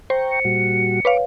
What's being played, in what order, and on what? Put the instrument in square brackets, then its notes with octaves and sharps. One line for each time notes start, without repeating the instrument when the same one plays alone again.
[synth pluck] C5 [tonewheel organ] G5 A#5 C#6
[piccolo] C#7
[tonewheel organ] A#2 G3 F#4
[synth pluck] B4 C#5 F5 [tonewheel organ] D6